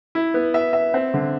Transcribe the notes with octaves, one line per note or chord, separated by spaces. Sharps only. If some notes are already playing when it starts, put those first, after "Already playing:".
E4
B3
E5
E5
C4
D3